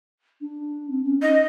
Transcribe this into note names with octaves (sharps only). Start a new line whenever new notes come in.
D4
C4
C#4
D#4 D#5